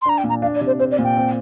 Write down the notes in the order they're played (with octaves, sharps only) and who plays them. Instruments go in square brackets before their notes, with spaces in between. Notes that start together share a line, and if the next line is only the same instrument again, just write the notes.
[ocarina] C6
[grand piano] D4 [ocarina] A#5
[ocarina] G5
[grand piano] A#2
[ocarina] A#5
[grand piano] D4 [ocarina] F5
[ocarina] D5
[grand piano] C3
[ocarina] C5
[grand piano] C4 [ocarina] C5
[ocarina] D5
[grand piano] A#2
[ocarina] G5
[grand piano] C4